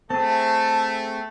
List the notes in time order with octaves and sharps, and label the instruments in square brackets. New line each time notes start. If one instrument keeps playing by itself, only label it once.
[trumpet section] A3 [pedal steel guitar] C4 G#4 [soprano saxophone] A5